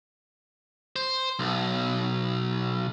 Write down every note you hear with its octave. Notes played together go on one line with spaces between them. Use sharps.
C5
B1